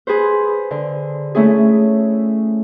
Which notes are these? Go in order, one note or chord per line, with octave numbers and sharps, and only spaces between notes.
G#4 B4 C5
D3
A3 C#4 E4 G#4